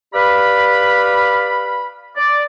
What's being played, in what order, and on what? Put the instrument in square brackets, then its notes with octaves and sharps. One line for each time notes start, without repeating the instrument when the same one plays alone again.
[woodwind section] G4 B4 D5 F5 B5
D5